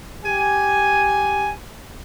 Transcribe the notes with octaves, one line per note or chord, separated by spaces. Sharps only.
G4 G#5